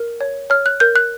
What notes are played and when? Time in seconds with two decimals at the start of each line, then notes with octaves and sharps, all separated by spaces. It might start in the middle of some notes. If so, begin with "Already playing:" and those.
Already playing: A#4
0.21 C#5
0.50 C#5 F6
0.66 F#6
0.80 A#4 G6
0.96 F#6